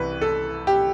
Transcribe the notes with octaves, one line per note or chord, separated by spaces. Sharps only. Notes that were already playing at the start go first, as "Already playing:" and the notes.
Already playing: C2 C3 E3 B4
A4
G4